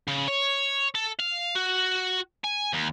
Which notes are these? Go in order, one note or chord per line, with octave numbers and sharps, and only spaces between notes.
C#3
C#5
A4
F5
F#4
G#5
D#2